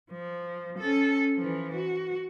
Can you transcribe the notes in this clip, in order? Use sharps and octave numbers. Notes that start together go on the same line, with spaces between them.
F3
C#4 A4
E3 F3
F#4